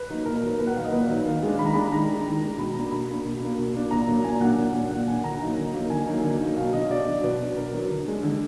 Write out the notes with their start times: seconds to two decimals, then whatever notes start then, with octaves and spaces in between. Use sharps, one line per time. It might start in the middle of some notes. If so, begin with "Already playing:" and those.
Already playing: B4
0.10 F#3 A#3 D#4
0.25 A#2 A#4
0.42 F#3 A#3 D#4
0.59 A#2 B4
0.67 F#5
0.75 F#3 A#3 D#4 F5
0.84 D#5
0.92 A#2 B4
1.09 F#3 A#3 D#4
1.26 D#3 F5
1.43 G#3 D4
1.59 D#3 B5
1.66 A#5
1.73 G#3 D4 B5
1.92 D#3 A#5
2.08 G#3 D4
2.26 D#3
2.41 G#3 D4
2.58 B2 B5
2.75 A#3 D4 A#5
2.91 B2 B5
3.08 A#3 D4
3.25 B2
3.42 A#3 D4
3.58 B2
3.75 A#3 D4
3.91 A#2 A#5
4.08 F#3 A#3 D4
4.24 A#2 G#5
4.41 F#3 A#3 D4 F#5
4.58 A#2
4.74 F#3 A#3 D4
4.91 A#2 F#5
5.07 F#3 A#3 D4 G#5
5.24 D3 A#5
5.41 F#3 A#3 D#4
5.58 D3
5.73 F#3 A#3 D#4
5.90 D3 G#5
6.06 F#3 A#3 D#4
6.24 D3
6.41 F#3 A#3 D#4
6.56 B2 F5
6.73 F#3 D4 D#5
6.90 B2 D5
7.06 F#3 D4
7.23 B2 B4
7.40 F#3 D4
7.56 B2 A#4
7.73 F#3 D4
7.90 D3
8.06 G#3 D4
8.23 D3